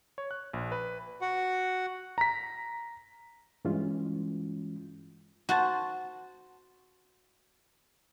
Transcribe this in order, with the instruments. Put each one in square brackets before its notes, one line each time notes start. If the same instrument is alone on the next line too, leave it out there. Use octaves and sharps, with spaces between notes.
[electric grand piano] C#5
F#6
A#1
B4
[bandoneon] F#4 F#5
[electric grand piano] A#5 B6
[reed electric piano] G2 E3 G#3 C#4 F4
[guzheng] F#4 C5 A5